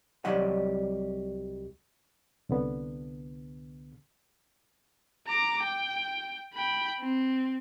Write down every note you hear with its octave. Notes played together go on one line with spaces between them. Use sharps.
C2 F#3 G3 D#5 F#5
C2 D3 B3
A#5 D6
G5
G5 B5
C4